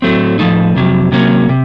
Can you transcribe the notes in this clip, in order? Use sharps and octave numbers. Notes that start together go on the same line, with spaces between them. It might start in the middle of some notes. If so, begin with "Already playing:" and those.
A2 F#3 A3 C4
A2 F3 A3 D#4
F2 C3 F#3
C3 F#3 A#3 C#4
C3